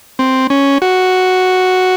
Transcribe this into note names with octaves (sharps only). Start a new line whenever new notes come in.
C4
C#4
F#4